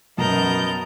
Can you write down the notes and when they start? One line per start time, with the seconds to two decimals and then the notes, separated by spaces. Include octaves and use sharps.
0.18 B1 F#2 B3 A#4 D#5 A5 A#5 G6